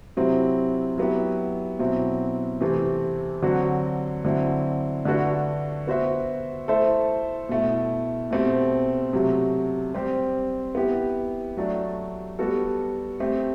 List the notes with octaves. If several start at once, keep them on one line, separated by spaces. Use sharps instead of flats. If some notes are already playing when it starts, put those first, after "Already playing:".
C3 F#3 C4 E4
F#3 B3 E4 G4
B2 F#3 C4 E4
C3 E3 A3 C4
D3 F#3 C4 F#4
D3 F#3 C4 E4
D3 A3 D4 F#4 B4
B3 F#4 C5 E5
A3 E4 A4 C5 E5
B2 A3 E4
B2 A3 C4 G4 C5
C3 F#3 A3
G3 C4 G4 C5
B3 E4 G4
F#3 A3 D4
G3 B3 F#4 A4
A3 C4 G4